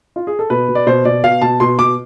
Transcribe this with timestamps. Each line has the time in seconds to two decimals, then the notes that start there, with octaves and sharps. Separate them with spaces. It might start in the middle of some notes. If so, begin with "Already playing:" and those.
0.16 F4
0.27 G#4
0.39 A4
0.50 B2 B4
0.69 B2
0.75 D5
0.87 B2 C5
1.05 B2 D5
1.24 B2 F5
1.42 B2 A5
1.60 B2 C6
1.79 B2 D6